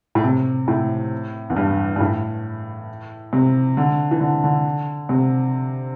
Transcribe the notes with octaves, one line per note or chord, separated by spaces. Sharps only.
A2
C3
A2
E2
G2
G2
A2
C3
D3
E3
D3
D3
C3